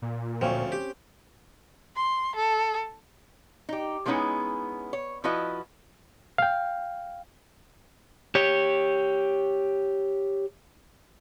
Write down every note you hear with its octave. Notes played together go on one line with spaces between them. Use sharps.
A#2
D2 F3 C4 C#4
G4
C6
A4
D#4 G4
F3 G#3 B3 C#4 D#4 E4
C#5
F3 E4 F#4 B4 D#5
F5 G5
G4 C#5